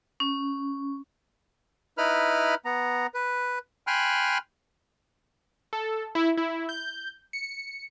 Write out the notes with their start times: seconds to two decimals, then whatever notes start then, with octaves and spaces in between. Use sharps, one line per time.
0.20 C#4
1.98 D#4 E4 B4 B5 F6
2.65 B3 A#5
3.14 B4
3.87 G5 G#5 B5 C6 F6 F#6
5.73 A4
6.15 E4
6.37 E4
6.69 G6
7.33 C#7